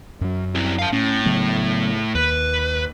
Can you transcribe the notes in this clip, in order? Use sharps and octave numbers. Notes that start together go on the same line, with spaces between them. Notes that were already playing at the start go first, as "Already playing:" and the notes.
F#2 F#3
C4 E4
F5 A5
A2 C#4
C#3 F#3 B3
D#2 B4